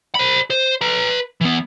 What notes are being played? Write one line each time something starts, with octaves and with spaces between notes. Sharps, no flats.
C5 B5
C5
B4 A#5
E3 B3